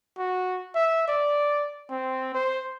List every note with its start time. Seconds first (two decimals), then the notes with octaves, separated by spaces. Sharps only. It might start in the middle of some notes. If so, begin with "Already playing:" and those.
0.18 F#4
0.75 E5
1.08 D5
1.90 C4
2.34 C5